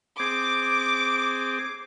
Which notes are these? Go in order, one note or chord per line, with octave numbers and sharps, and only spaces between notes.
C4 G#4 D6